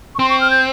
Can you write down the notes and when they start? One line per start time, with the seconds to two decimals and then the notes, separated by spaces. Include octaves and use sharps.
0.15 C#6
0.19 C4 C6
0.30 C#6
0.41 F6
0.50 G6